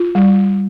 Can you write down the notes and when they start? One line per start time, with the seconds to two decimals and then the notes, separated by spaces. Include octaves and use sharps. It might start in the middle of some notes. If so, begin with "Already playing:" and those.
Already playing: F4
0.15 G3